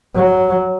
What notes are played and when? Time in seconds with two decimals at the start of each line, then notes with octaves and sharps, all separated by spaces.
0.16 F#3